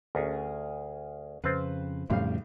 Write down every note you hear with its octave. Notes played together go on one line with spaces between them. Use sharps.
D2 C#4 G#4 A#4
F2 C#3 C4 F4 B4 C5
B1 F2 A2 C#3 G3 F5